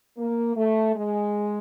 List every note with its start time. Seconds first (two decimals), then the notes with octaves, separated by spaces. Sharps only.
0.18 A#3
0.57 A3
0.95 G#3